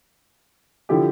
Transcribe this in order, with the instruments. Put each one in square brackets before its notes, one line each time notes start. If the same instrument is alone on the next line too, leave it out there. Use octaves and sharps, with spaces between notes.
[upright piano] D3 F3 E4 G4